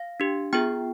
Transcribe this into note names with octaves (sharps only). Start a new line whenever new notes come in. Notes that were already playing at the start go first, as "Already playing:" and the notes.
Already playing: F5
D4 G4
B3 F4 G#4 G5